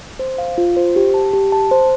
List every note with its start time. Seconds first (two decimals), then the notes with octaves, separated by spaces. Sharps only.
0.19 C5
0.38 F5
0.58 F4
0.76 C5
0.96 G4
1.14 A5
1.33 G4
1.52 A5
1.71 C5